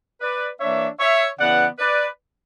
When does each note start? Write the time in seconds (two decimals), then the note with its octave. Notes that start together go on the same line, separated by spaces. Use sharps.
0.21 B4 D5
0.60 E3 A#3 D4 C#5 E5
1.00 C#5 E5
1.39 C#3 E3 B3 D5 F#5
1.79 B4 D5